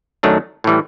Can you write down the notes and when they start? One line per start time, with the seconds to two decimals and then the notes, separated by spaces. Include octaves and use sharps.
0.23 F#2 D#3 F#3 A3 D4
0.64 A2 E3 G3